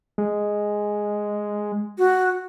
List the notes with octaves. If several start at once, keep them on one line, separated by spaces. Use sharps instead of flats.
G#3
F#4